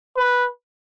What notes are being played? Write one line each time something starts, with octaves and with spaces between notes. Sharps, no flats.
B4